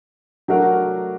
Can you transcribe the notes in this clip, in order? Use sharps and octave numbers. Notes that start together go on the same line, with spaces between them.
F#3 A3 D4 F#4 A#4